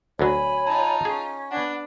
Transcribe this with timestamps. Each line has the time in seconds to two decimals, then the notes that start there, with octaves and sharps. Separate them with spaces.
0.19 D2 F#3 C#5 G#5 B5
0.66 D#4 F4 A5
1.05 C#4 G#4
1.51 B3 D4 F#5